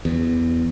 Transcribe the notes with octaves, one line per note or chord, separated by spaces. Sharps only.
E2